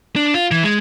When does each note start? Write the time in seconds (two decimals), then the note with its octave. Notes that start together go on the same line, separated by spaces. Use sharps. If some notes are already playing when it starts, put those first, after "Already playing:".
0.16 D4
0.34 F4
0.51 E3
0.64 G#3